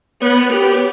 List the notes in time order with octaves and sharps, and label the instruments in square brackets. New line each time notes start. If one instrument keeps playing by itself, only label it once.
[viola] B3 [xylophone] C#5
[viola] G4 [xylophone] A#4
[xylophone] B4
C#5